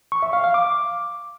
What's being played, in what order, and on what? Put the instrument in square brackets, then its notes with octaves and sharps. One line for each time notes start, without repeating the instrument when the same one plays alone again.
[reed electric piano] C#6
E5
F5
F5
D6